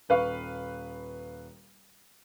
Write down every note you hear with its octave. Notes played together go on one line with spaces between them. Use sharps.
D#1 B4 F5 C#6